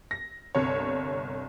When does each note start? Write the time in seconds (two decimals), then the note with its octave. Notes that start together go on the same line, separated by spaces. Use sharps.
0.11 A#6
0.55 G1 C2 C#5